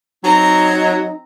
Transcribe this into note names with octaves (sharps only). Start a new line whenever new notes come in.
F#3 C4 D#4 A#5